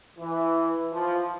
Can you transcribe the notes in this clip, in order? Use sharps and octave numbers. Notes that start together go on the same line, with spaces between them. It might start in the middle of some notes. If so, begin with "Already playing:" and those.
E3
F3